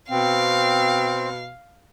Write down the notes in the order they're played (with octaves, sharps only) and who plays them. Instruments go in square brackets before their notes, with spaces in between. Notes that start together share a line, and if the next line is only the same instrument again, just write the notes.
[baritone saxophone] B2 [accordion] C4 [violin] F5